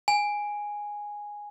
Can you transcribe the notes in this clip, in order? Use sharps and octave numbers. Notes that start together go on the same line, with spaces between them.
G#5